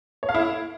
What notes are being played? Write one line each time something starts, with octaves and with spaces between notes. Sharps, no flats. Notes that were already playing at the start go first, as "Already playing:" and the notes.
C#5
F5
E4